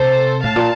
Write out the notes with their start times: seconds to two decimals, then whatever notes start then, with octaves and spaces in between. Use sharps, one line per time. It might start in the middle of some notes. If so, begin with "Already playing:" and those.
Already playing: C3 A4 C5
0.43 A2 F5 A5
0.56 A#2